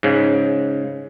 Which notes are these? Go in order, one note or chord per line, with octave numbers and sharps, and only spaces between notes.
G#2 C#3